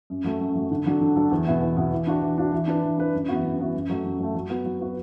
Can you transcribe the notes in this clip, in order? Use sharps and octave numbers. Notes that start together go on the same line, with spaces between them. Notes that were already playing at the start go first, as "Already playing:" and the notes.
F#2
F#3 A3
F#2
F#3 A3
D3
F#3 D4 A4
D3
F#3 D4 A4
E2
B2 B3 E4
E2
B2 B3 E4
E3
D4 F#4
E3
D4 F#4
E3
D4 B4
E3
D4 B4
F#2
E3 B3 F#4
F#2
E3 B3 F#4
F#2
F#3 A3
F#2
F#3 A3
F#3
B3 F#4 B4
F#3
B3 F#4 B4